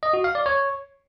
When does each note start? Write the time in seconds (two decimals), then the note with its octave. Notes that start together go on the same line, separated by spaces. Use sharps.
0.03 D#5
0.13 F#4
0.24 F5
0.35 D5
0.46 C#5